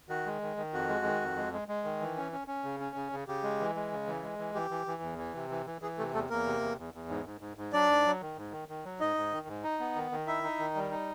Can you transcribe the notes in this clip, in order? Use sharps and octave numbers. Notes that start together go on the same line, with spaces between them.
D#3 F#4
G#3
D#3
D#3
F2 F#4
G#3
D#3
F2
G#3
G#3
G#3
D#3
E3
C#4
C#4
C#4
C#3
C#4
C#3
C#3
C#3 G4
G#3
E3
G#3
C#3
E3
G#3
E3
E3 G4
E3
E3
E2
E3
C3
E3
E3
E3 G#4
C3 A3 A4
E2 A3 A4
E2 A#3 A#4
C3
E2
E2
E2
G#2
G#2
G#2
G#2
F#3 D4 D5
G#2
F#3
D#3
G#2
D#3
D#3
F#3
G#2 D#4 D#5
G#2
D#3
G#2
D#4
B3
D#3
D#3
D#4 E4 E5
D#4
D#3
G3
D#4